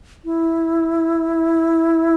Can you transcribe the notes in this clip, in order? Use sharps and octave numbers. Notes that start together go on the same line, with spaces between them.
E4